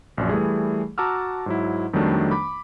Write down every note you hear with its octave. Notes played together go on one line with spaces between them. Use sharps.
A#1 F#2 D5
E3 G3 A3 G#4
F#4 A5 A#5 D6 E6 F6
G#2 F#3 E4
F2 D#3 F#3 G3 A3 D4
B5 D6